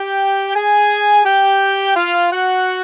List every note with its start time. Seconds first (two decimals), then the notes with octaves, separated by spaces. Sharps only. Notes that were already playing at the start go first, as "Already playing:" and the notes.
Already playing: G4 G5
0.56 G#4 G#5
1.25 G4 G5
1.96 F4 F5
2.31 F#4 F#5